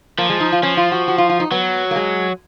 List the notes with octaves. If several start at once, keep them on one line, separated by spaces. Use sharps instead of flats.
F3 A#3
G#3
D#4
F4
F3 C#4
F4
F#4
F#4
F4
F4
D#4
F#3 B3
A#3
G#3